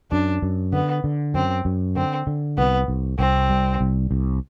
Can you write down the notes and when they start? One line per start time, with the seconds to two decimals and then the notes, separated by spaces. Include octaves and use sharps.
0.11 F#2 D4
0.42 F#2
0.73 D3 B3
1.04 D3
1.34 F#2 C4
1.65 F#2
1.96 D3 C4
2.27 D3
2.57 C2 B3
2.88 C2
3.19 C2 C4
3.50 G3
3.81 C2
4.11 C2